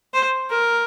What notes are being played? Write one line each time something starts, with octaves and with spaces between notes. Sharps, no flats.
C5
A#4